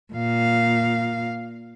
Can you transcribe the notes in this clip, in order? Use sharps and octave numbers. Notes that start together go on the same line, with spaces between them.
A#2 F5